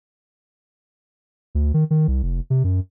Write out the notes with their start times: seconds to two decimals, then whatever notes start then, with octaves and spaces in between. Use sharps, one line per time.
1.55 D2
1.74 D#3
1.91 D#3
2.08 C2
2.23 F1
2.50 C3
2.64 F#2